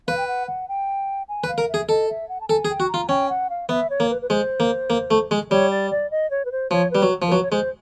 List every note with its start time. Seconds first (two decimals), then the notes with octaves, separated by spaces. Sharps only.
0.08 B4 F5
0.17 G5
0.28 F#5
0.47 F#5
0.68 G5
1.29 G#5
1.44 B4
1.48 F5
1.58 A#4
1.69 E5
1.74 G#4
1.89 A4 D#5
2.09 E5
2.29 F#5
2.41 A5
2.48 A4 G#5
2.65 G#4
2.70 G5
2.80 F#4
2.89 A#5
2.94 F4
3.09 C#4 G5
3.29 F#5
3.50 F5
3.69 B3 E5
3.90 C#5
4.00 A#3
4.10 B4
4.22 B4
4.29 G#3 C5
4.60 A#3
4.90 A#3
5.11 A3
5.31 G#3
5.51 G3 C#5
5.71 D5
5.91 D5
6.11 D#5
6.31 C#5
6.45 B4
6.52 C5
6.71 F3 C#5
6.91 G3 B4
7.02 F#3
7.22 F3
7.28 A#4
7.32 F#3 B4
7.43 C#5
7.51 G#3 C5